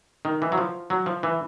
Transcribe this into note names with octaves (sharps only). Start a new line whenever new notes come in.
D#3
E3
F#3
F3
F#3
F3
E3